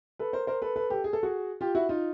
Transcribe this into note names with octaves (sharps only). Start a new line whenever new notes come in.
A4 B4
A#4 C5
A#4 C5
A4 B4
A4 B4
G4 A4
G#4
A4
F#4 G#4
F4 G4
E4 F#4
D#4 F4